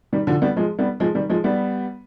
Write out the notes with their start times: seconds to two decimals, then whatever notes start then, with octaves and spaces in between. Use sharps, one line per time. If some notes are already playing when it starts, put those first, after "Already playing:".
0.13 D#3 G3
0.27 D3 F3
0.42 G3 B3
0.56 F3 G#3
0.79 G3 B3
1.00 F3 G#3
1.15 D#3 G3
1.29 F3 G#3
1.44 G3 B3